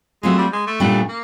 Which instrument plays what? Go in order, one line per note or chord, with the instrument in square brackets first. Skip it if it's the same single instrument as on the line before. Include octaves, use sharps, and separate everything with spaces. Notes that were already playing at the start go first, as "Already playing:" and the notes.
[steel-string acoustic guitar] F#3 A3 C4 F4 [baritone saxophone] G#3
[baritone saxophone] G3
G#3
A3
[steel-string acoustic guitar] A#2 G3 B3 D4 G4 [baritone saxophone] A3
[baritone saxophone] A#3